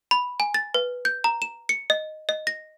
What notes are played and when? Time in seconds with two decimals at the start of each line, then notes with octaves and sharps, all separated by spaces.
0.11 B5
0.40 G#5
0.54 A6
0.74 B4
1.05 G6
1.24 A#5
1.42 E7
1.69 C#7
1.90 D#5
2.29 D#5
2.47 A#6